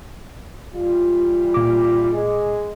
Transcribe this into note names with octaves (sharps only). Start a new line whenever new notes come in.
E3 G3 F4
A#2 D6
G#3